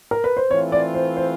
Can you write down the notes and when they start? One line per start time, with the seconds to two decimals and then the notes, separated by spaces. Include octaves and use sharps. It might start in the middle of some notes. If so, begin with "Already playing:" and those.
0.11 A#4
0.24 B4
0.37 C5
0.50 E3 A3 C4 F4 C#5
0.72 D5
0.95 C5
1.17 C5